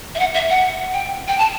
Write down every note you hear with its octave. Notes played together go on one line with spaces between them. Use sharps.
E5
F#5
E5
F#5
G5
G5
A5